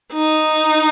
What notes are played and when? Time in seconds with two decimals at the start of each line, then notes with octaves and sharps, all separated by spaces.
0.13 D#4